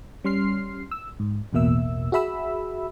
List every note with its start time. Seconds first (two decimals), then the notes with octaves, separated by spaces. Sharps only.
0.24 G3 C#4 C6 F6 C7
0.91 E6
1.20 G#2
1.53 A1 E2 B2 A#3 E5 E6
2.12 F#4 G#4 E5 B5 E6